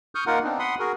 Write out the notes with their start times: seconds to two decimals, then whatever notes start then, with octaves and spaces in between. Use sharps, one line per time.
0.15 C#6 D#6 F6 G6
0.27 A#3 D#4 F4 A#4 F#5
0.44 B3 C4 D4 D#4
0.59 F#5 B5 C6 D#6
0.79 F#4 G#4 A#4